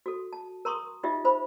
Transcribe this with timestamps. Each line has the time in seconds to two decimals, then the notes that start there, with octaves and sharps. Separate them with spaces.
0.06 F#4 A4
0.33 A5
0.65 A#4 A#5 C6 C#6 D#6
1.03 D#4 F4 G4 D#5 E5
1.25 F4 C5 B5